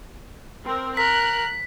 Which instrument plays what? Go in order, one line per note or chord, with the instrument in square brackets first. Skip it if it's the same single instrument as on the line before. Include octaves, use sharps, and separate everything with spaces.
[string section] C4 A#4
[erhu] A#4 [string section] F#6 [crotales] B6